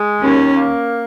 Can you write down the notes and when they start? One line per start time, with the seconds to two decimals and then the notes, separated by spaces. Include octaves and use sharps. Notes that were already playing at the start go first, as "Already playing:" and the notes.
Already playing: G#3
0.22 D#2 C#4
0.56 A#3